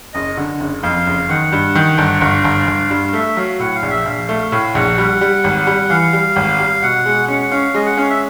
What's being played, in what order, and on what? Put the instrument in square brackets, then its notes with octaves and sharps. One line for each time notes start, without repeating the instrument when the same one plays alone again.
[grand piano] F#1 [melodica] D#5
[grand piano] D3
F#1
[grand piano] F2 [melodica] F5
[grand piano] F#1
[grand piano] D#3 [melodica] F#5
[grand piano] G2
D#3
G1
[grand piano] G1 [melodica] F5
[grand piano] G1
G1
G2
[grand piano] A3 [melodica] E5
[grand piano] F#3 [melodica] F5
[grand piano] A2 [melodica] F#5
[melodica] F5
[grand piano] A#1
[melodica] E5
[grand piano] A#1 [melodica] F5
[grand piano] A3
[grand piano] A2 [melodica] F5
[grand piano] A#1 [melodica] F#5
[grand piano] G3
G3
G#1
G3
[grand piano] E3 [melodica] F5
[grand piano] G3
G#1
G3
[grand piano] B2 [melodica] F#5
[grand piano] G#3
[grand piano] C#4 [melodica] F#5
[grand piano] C#4 [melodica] F5
[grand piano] G#3 [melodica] D#5
[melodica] F#5
[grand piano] C#4 [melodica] F5
[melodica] E5